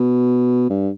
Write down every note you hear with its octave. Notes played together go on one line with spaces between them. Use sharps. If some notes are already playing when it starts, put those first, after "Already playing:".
Already playing: B2
G2